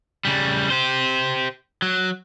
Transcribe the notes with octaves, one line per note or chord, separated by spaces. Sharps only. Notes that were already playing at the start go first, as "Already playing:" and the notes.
C#3 G3
G4 C5
F#3